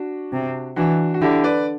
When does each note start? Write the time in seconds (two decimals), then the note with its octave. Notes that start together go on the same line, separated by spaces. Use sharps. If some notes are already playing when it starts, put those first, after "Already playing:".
Already playing: D4 F#4
0.33 C3
0.76 E3 D4 F#4
1.14 F#4
1.21 D3 E4 G4
1.44 B4 D5